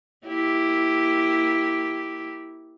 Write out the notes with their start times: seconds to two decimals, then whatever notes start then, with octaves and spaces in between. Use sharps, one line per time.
0.27 A#3 E4 G4